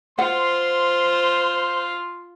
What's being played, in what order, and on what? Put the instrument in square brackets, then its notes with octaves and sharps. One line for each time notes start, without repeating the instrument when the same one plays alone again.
[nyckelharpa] F4 [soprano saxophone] C5 [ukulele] F#5 [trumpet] C6